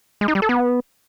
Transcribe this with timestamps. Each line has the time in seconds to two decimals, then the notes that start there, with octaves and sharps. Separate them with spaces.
0.21 G#3
0.28 D#4
0.35 G3
0.42 A4
0.49 B3